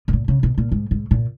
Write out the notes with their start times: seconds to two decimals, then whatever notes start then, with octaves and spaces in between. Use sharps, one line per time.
0.08 B2
0.13 A#2
0.28 C#3
0.43 B2
0.58 A#2
0.72 G#2
0.91 G#2
1.11 A#2